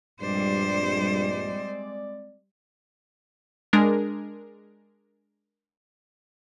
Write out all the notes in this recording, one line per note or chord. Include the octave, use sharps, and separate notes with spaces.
A#1 G2 G3 G#3 C4 C5 D5
G#3 D4 G#4 A#4